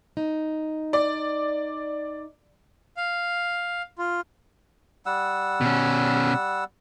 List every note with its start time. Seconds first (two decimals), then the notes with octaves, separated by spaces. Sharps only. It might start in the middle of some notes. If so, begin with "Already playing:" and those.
0.17 D#4
0.93 D5
2.97 F5
3.99 F4
5.06 G3 F#5 E6
5.61 B2 C#4